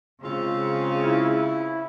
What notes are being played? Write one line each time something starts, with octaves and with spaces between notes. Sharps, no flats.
C#3 G#3 C4 F4
E4